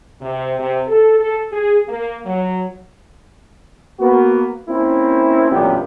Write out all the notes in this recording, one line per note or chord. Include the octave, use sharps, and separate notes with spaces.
C3
C3
A4
A4
G#4
A#3
F#3
A#3 B3 F#4
A#3 C4 C#4 E4
A1 F#2 A#2 D3 B3 G4